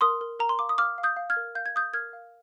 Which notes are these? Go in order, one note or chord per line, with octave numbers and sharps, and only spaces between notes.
A#4 C6 D#6
A#4
A#4 A#5
C6
F5 D6
D#6
F5 D6 F6
F5
D#6 G6
F5
F6 G#6
A#4
F5 G6
G#6
F5 D#6 G6
A#4 F6 G#6
F5